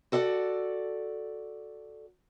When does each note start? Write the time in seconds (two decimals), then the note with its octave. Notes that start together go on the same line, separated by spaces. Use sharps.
0.12 F#4 A4 D5 F5 F#5